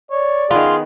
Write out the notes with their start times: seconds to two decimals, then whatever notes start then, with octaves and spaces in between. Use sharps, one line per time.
0.11 C#5 D5
0.51 D#3 B3 F4 G#4